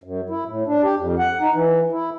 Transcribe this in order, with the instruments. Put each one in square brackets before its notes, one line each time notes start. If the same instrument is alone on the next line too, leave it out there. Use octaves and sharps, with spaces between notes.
[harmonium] F#2
E4
A2
D4
G4
F2
F#5
D#4
E3
E4